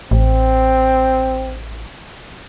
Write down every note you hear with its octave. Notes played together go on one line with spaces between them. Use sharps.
A1 C4